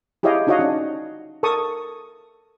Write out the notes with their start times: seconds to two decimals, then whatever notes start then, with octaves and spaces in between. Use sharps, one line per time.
0.23 E4 G4 G#4 C#5 D#5 F5
0.47 D4 D#4 F#4 C#5 D#5 F5
0.59 C#4 D4
1.43 A4 A#4 A5 C#6 D#6